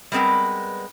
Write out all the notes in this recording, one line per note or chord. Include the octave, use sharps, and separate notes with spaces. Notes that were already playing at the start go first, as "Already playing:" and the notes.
G3 G#3 B3 C4 A#4 B4